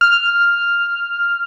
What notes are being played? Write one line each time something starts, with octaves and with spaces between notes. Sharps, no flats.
F6